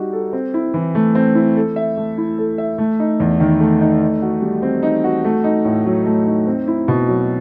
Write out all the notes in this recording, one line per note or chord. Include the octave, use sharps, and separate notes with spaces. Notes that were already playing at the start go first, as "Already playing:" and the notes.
Already playing: G3 D#4 F#4
A4
C4
E4
E3
A3
C4
E4
A4
E5
A3
E4
A4
E5
A3
D#4
E2
D#3
A3
D#4
D#4
F#4
G3
C4
D#4
F#4
A3
D#4
A2
F#3
A3
D#4
C4
E4
B2
F#3